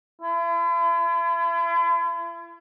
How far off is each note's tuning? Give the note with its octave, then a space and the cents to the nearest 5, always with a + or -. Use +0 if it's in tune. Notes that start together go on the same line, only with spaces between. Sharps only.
E4 +45